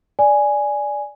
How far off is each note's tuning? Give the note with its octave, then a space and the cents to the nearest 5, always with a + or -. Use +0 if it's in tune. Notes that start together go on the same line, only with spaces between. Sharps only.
D5 -5 G#5 +0